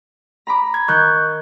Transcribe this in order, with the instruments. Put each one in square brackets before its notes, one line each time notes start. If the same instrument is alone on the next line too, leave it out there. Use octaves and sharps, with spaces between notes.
[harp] A#5 B5 D6
[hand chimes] G#6
[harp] D#3 [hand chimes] C#6 F#6 G6